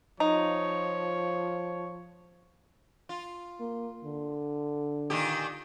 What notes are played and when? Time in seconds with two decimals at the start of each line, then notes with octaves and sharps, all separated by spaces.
0.20 F3 D#4 C#5
3.09 F4
3.60 A#3
4.04 D3
5.10 A#2 D#3 G4